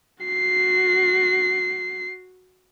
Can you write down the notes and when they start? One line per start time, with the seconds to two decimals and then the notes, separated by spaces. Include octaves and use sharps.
0.24 F#4 C7